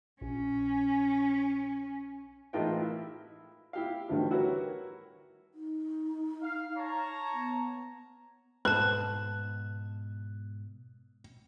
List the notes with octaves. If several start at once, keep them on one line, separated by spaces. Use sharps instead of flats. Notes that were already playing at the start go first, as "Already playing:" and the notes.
A#1 C#4
A1 G#3 D#4 F4 A#4 G5
E4
E4 G4 F5
A1 D2 D3 D#3 G3
E4 F#4 A#4 B4 C#5
D#4
F5
C#5 A5 A#5
B3
G#2 B2 G#3 B4 A5 F#6